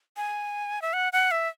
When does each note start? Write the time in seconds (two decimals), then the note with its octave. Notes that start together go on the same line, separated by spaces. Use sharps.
0.17 G#5
0.82 E5
0.93 F#5
1.13 F#5
1.31 E5